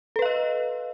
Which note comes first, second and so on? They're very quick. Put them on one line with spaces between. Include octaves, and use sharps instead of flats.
A4 B4 F5 D#5